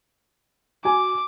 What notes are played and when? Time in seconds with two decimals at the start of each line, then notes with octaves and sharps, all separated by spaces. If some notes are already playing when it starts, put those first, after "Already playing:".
0.85 F#4 G#5 D6